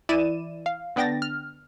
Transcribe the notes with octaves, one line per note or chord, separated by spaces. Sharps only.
E3 E4 D5 D#7 E7
F5
D3 B3 D4 G5 A6 A#6
F6